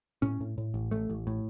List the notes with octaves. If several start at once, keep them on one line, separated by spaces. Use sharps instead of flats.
A2 C#4
A2
A2
A1
A1 A3
A1
A2